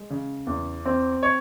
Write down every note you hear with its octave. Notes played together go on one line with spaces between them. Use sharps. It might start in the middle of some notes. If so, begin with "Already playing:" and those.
Already playing: G#3
C#3
E2
C4
C#5